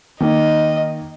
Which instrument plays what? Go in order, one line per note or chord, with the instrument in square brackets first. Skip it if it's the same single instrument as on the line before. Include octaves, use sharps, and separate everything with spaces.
[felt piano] D#3 A#3 [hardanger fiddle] D#5